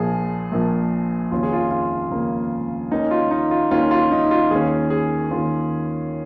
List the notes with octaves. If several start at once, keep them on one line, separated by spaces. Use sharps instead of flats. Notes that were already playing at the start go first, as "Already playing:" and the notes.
Already playing: A#1 A#2 F3 G#4
A#1 A#2 F3
F1 D#2 C#3 A#3 C#4 F4
G#4
F4
F4
F1 D#2 C#3 A#3 C#4
D#2 D#3 A#3 C#4 D#4
F4
D#4
F4
D#2 D#3 A#3 C#4 F4
F4
D#4
F4
D#2 D#3 C#4 G#4
G#4
D#2 D#3 C#4 F4